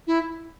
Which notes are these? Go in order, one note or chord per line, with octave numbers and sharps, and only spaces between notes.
E4